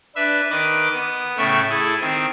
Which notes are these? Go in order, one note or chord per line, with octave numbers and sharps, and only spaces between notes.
D4 B4 E5
D#3 B4 D#5 D6
B3
A2 C#3 A3 E5 G5 C#6
E4 G#4 A4
D#3 C4